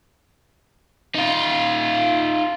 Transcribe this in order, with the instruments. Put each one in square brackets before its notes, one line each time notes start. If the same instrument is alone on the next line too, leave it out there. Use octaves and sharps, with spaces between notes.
[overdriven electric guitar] D#4 F4